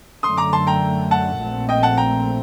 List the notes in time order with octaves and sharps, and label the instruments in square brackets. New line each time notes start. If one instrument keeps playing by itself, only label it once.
[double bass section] F#2 D3 A3 [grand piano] C6 D#6
[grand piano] A#5 D6
A5 C6
G5 A#5
F#5 A5
[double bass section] A#1 A#2 A3 C4
[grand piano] D#5 G5
F#5 A5
G5 A#5